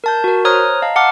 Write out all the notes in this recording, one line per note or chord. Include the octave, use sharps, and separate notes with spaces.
A#4 A5 G6
F#4 A#4
C5 C#5 A#5 D#6 F6 F#6
D#5 F5 A5 A#5
F#5 A5 D6 F6